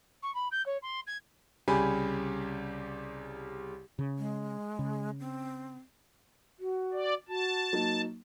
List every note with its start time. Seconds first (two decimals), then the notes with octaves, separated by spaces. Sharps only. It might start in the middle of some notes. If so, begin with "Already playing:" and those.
0.22 C#6
0.34 B5
0.51 G6
0.66 C#5
0.82 C6
1.07 G#6
1.68 C2 C#3 G4 G#5 B5
3.99 C#3
4.18 G#3
4.79 C#3
5.19 C4
6.59 F#4
6.93 D5
7.28 F#4 A5
7.73 F#3 A#3 D#4